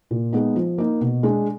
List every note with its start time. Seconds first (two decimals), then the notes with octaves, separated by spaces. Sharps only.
0.11 A#2
0.33 G#3 B3 D#4
0.56 F3
0.78 A#3 D#4
1.01 B2
1.23 G#3 D4